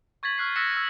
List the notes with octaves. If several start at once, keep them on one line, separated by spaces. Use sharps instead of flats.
C#6 G#6 A6 B6 F#7
C#6 F6 F#6 C7
E6 F#6 A#6 B6 C#7 E7
C#6 E6